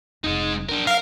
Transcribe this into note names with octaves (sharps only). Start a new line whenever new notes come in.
F1 C#3 G#3 D#4
F#2 D4 A#4
A#4 F5